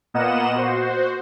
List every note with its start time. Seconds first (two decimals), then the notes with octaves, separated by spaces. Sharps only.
0.14 A#2 A#3 B3 D#5 F#5 E7
0.55 F#4 C5